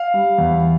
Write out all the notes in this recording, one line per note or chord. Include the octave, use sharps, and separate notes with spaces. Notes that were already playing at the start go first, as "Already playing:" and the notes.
Already playing: F5
G3
E2